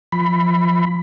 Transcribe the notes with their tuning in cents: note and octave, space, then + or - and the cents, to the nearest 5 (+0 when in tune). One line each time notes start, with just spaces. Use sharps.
F3 +0 B5 +15